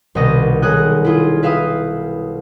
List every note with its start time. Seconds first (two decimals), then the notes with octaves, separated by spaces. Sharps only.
0.15 C2 B2 D#3 B3 G4 D#5
0.62 B1 D#3 G#4 G5 D#6 F#6
1.05 E4 F4 G#4
1.43 B4 E5 F5 G5 D#6